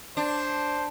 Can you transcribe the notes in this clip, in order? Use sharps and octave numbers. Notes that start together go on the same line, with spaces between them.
D4 C5